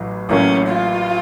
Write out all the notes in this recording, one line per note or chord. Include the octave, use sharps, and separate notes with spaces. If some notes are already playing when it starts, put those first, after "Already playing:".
Already playing: A1 A2 F#3
A1 A2 F#3 A#3 C#4
F4